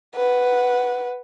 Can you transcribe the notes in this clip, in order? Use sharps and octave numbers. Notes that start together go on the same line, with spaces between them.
B4 F#5